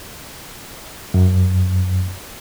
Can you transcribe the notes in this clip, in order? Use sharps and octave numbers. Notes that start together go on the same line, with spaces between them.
F#2